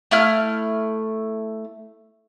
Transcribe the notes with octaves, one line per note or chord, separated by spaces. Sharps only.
A3 E4 F6